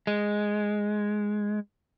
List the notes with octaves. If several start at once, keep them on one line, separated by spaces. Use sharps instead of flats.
G#3